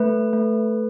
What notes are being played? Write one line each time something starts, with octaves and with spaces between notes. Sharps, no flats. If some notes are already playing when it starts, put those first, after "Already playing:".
Already playing: A3 B4
A3